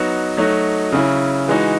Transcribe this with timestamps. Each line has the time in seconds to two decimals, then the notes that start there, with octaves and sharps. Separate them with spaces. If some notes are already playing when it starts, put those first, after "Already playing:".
Already playing: F#3 B3 D#4 F#4
0.37 F#3 A3 D#4 F#4
0.92 C#3 F#3 C#4 E4
1.48 E3 G#3 D#4 F#4